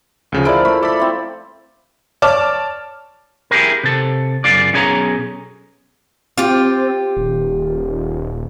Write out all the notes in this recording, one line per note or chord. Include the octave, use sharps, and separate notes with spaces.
D2 C#3 F3
F3 E4 A#4 D5 D7
A3 B5
A4 D5 B5
C4 E4
C#5 D5 A5 D6 F6
E4 G4 G#4 A#4
C3 A4
F#2 C#3 F4 D5
B1 C#4 G#4 C#5 A5 A#5
C4 F4 G4
D#1